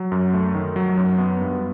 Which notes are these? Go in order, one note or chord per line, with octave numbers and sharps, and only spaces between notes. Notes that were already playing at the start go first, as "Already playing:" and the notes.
Already playing: F#3
F#2
A3
D#3
F#3
F#2
B3
G2